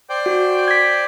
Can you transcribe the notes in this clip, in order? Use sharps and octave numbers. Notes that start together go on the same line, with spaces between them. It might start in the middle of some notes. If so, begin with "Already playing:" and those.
C5 D5 G5
F#4
G#6 B6